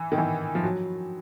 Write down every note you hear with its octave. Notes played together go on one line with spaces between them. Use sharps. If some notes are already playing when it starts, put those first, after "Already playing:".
Already playing: E3
D#3
E3
F3
F#3